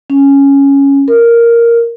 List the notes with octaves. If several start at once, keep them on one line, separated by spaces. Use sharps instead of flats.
C#4
A#4